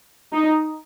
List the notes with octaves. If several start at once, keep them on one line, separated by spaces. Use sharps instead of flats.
D#4